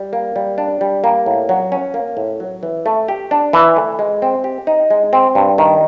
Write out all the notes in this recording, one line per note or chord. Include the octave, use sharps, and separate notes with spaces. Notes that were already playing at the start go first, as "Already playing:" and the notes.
Already playing: G3
A#3
G3
D4
G3
A#3
A2
F#3
C#4
A#3
A2
F#3
E3
A3
G4
D4
E3
A3
G#3
C4
G4
D#4
G#3
C4
G2
D#3